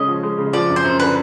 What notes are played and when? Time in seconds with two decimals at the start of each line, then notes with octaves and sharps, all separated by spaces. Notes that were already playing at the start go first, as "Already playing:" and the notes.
Already playing: C#3 G#3 C#4 D#5
0.08 F3
0.23 G#3
0.38 C#3
0.53 F3 D5
0.70 F#2
0.76 C5
0.85 F#2
1.00 D3 B4